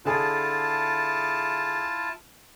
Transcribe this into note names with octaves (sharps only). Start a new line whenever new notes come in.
D3 E4 F4 G#4 A5